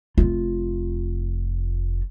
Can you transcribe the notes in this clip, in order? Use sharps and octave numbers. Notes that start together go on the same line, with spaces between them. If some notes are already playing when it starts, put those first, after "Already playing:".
F1 F4